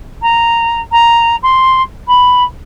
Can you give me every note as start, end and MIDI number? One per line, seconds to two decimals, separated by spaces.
0.22 0.81 82
0.92 1.36 82
1.43 1.82 84
2.08 2.43 83